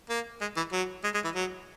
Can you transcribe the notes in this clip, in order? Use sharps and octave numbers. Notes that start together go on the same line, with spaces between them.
A#3
G#3
E3
F#3
G#3
G#3
E3
F#3